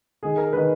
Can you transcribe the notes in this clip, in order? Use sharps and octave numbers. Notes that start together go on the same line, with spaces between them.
D#3 G#3 G#4
A#4
D#3 G#3 B4